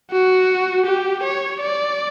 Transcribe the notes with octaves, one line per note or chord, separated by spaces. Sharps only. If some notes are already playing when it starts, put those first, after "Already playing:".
F#4
G4
C#5
D5